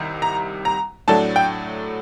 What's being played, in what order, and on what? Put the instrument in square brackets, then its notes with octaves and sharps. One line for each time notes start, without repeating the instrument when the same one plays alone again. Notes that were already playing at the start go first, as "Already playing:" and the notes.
Already playing: [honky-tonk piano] C2 C3 D#3
A#5
A#5
A2 F#3 A3 D4 A5
G5